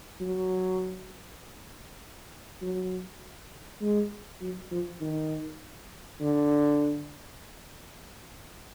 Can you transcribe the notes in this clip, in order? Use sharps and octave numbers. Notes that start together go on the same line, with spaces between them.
F#3
F#3
G#3
F#3
F3
D#3
D3